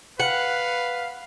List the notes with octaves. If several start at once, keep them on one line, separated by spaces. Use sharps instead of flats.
B4 F5 F#5